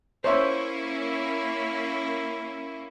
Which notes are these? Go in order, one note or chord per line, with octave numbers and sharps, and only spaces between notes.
A#3 C#4 E4 C5 C#5 E5